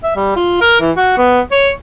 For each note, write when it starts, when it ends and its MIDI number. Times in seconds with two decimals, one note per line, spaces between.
0.04 0.14 76
0.16 0.34 55
0.36 0.59 65
0.61 0.79 70
0.81 0.91 52
0.97 1.15 66
1.17 1.40 59
1.52 1.69 73